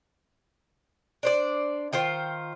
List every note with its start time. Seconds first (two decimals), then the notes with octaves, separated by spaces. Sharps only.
1.23 D4 C5 D5
1.93 D#3 F4 C5 G5